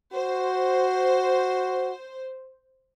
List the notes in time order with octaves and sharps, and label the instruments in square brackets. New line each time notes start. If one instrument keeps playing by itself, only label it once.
[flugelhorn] F#4 [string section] C5